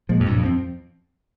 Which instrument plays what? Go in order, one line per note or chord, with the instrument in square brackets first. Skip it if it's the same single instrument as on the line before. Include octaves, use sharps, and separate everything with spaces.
[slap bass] A#2 [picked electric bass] F3 G#3
[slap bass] F2
[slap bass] G2 [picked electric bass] A#2
[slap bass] F2
[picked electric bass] F3 C4